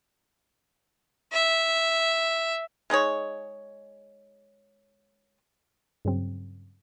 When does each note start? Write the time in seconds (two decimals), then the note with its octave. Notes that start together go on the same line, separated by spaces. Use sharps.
1.32 E5
2.90 G#3 D#4 G#4 C#5
6.05 G2 C#3 F#3 C4